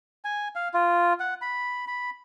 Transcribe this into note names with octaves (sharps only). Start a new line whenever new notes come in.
G#5
F5
F4
F#5
B5
B5